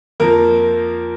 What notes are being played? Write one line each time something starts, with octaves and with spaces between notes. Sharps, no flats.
F2 F3 A#3 A#4